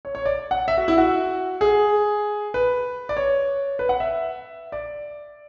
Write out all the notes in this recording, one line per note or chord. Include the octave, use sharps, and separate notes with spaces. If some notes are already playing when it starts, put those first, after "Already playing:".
C#5
C#5
D5
F#5
E5
F#4
E4
F#4
G#4
B4
D5
C#5
B4
F#5
E5
D5